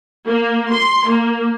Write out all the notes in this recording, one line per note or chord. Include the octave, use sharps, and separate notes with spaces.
A#3
C6
A#3